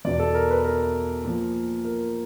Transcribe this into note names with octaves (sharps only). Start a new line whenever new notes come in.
E2 B2 D5
A4
A#4
B4
A#4
A#2 F3
A#4